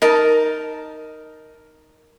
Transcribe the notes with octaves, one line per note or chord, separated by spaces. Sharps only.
D#4 A#4 A5